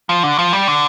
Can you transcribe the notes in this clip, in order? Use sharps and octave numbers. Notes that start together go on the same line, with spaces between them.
F3
D3
F3
G3
D3